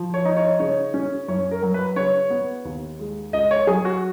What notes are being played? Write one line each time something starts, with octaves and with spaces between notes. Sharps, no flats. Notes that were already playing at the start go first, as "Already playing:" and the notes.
Already playing: F3
C#5
D#4
C#5
C#3 C#5
C#4
F#2 C#5
A#4
F#3
B4
C#3 C#5
B3
D#2
G#3
C#2 D#5
C#5
F#3 G#4
F#4